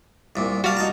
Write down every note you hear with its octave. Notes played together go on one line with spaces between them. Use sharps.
C2 A#2
G3 F#4 F5 A5
D#4 A5 A#5